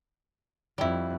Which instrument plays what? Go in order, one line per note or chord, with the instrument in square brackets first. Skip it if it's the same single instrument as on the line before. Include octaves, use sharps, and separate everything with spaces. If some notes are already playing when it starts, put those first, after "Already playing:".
[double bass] F2 [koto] G3 E4